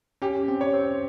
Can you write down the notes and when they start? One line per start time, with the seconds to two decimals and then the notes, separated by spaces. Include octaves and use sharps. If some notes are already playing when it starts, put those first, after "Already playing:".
0.22 C#4 G4
0.48 C4
0.61 C#5
0.73 C4